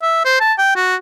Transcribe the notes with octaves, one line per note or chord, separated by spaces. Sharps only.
E5
C5
A5
G5
F#4